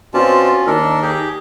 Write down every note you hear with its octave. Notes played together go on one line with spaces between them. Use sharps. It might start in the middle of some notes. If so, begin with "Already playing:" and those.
B2 C4 C#4 F4 D5 A5
D#2 D4 A4 A#4
G4 G#4